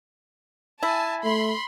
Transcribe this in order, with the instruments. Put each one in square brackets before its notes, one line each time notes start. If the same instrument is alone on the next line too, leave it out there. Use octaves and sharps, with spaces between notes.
[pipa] E4 [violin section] G#5 A5
[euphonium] A3 [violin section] B5 C6